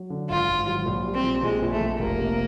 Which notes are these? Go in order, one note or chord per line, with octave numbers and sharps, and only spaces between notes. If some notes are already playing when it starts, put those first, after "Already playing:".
Already playing: F#3
D3
G#1 F4
G#1
F#3
A#1
G3
C4
A#1
A#1 G#3
A#1
A3
A#1
F1 A#3
C3